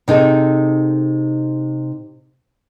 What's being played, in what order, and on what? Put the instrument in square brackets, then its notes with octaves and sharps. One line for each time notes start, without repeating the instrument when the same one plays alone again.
[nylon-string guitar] C3 D#4 G#4 A4